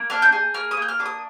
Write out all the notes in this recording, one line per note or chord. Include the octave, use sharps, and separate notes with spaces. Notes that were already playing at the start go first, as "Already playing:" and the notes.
Already playing: A#3
D4 F6
G6
G#4
A#3 F6
D#6
A#3
G6
F6
D4 D6
D#6